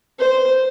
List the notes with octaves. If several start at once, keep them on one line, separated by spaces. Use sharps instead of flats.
C5